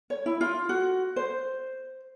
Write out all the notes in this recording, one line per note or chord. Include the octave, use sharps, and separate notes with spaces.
C#5
E4
F4
F#4
C5